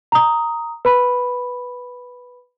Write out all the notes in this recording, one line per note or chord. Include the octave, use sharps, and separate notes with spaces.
A#5 D#6
B4 B5